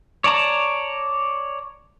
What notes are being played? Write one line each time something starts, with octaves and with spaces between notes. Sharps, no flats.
C#5 D5 A5 A#5